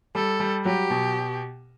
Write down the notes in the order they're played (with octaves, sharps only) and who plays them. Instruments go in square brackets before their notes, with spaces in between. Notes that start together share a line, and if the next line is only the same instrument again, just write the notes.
[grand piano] G3 [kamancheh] A4
[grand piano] G3
[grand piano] F#3 [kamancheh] G4
[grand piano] B2